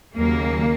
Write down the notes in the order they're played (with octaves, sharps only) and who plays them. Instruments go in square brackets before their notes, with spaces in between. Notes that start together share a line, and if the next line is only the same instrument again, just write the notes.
[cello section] D#2 C#3 F#3 A#3